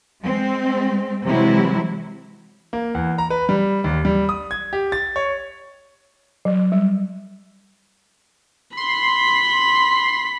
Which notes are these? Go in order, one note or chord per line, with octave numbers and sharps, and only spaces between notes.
G#3 C4
C3 E3 F#3 G#3 E4
A#3
E2
A#5
B4
G3
D#2
G3
D#6
G#6
G4
A6
C#5
F#3
G3
B5 C6